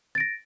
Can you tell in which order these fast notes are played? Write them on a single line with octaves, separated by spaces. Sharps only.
A6 D7 A#6